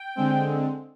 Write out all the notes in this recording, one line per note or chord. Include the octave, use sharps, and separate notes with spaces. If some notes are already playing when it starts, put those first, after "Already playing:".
Already playing: G5
D3 G#3 C4